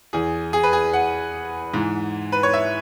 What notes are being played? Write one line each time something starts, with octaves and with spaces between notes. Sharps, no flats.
E2 E3 G#4
G#4
B4
G#4
F#5
G#2 E3
B4
C#5
E5